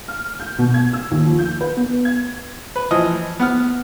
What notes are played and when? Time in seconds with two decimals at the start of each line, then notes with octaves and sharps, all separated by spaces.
0.08 F6
0.40 G6
0.58 B2
0.74 G#6
0.93 E6
1.11 D#2
1.26 F3
1.39 G6
1.61 B4
1.77 B3
2.05 G#6
2.76 B4
2.91 E3 F3 D#5
3.39 B3 F#5 F6